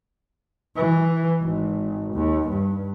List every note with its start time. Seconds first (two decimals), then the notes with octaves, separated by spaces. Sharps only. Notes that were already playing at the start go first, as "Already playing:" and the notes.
0.76 E3
1.43 G#1
2.14 D#2
2.50 G2